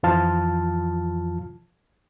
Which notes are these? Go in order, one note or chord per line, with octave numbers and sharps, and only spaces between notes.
F2 E3 F3 F4 A5 F6